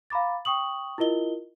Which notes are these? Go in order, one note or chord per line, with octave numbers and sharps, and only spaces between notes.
F5 A#5 B5 D6 A6
G5 C#6 D#6 F#7
E4 F4 A#4 D#5 G7